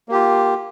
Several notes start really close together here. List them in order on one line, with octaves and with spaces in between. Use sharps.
A#3 G4 F4